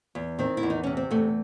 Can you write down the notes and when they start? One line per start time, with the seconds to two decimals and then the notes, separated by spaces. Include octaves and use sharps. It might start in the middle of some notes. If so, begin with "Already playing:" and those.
0.15 E2
0.39 D#3 C4
0.57 E4
0.63 E2
0.70 D#4
0.83 C3 C#4
0.97 C4
1.11 E2 A3